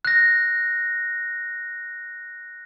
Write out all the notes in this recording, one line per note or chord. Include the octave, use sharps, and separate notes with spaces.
F#6 A#6